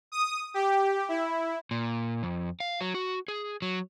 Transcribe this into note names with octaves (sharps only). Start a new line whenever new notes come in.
D#6
G4
E4
A#2
F2
F5
F#3
F#4
G#4
F#3